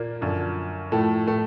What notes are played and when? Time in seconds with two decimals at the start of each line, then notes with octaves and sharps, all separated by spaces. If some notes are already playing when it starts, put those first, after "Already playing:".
Already playing: A#2 A#3
0.21 F#2 D3 F3
0.92 A2 F3 A3
1.26 A2 A3